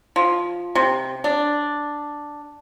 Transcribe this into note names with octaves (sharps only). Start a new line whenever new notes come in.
F3
C3
D4